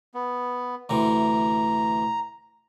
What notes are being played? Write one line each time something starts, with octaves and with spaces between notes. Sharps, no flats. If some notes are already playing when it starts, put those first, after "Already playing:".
B3
D2 C3 E3 A#5